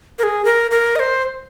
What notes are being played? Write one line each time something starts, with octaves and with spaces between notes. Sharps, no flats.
A#4
G#4
A#4
A#4
D#5
C5